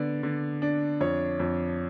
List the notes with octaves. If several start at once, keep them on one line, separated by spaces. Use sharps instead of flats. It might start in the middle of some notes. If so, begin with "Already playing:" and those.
Already playing: D3 B3 D5
D3
D4
F2 C#5
F2